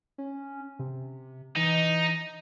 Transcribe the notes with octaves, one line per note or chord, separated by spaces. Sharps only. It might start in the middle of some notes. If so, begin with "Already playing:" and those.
C#4
C3
E3 D#4